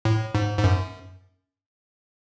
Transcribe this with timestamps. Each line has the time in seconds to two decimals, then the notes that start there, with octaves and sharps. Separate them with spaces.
0.05 A2
0.35 G#2
0.59 G#2
0.64 F#2